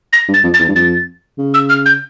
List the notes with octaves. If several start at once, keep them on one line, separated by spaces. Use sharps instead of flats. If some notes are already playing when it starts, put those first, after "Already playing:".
A#6
G2
A6
F2
A6
E2
G2
F2 A6
C#3
E6
F6
G6